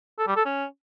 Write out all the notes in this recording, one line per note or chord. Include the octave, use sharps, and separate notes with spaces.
A4
G3
A4
C#4